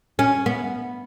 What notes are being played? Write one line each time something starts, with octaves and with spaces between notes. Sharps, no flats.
C#4
B3